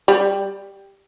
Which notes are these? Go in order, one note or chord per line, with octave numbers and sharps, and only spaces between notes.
G3